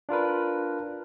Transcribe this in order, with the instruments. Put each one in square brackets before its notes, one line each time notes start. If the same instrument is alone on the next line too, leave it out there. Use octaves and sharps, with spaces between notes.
[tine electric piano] D4 F4 A#4 B4